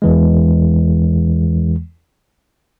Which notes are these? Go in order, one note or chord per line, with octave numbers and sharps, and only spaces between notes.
E2 E3 G#3